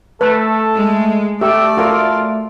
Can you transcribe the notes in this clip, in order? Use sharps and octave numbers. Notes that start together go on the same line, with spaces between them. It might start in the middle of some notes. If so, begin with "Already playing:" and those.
A3 A4 B4
G#3
A3 G4 D5 E5
F4 F#4 A4 A#4